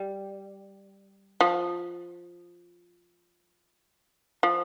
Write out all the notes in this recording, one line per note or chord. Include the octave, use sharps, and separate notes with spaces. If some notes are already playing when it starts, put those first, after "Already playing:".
Already playing: G3
F3
F3